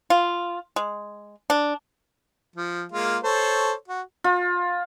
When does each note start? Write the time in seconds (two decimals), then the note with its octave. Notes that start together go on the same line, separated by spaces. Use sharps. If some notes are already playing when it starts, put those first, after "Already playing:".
0.10 F4
0.76 G#3
1.50 D4
2.56 F3
2.92 G#3 A#3 F4
3.23 A4 C5 C#5
3.88 F#4
4.24 F4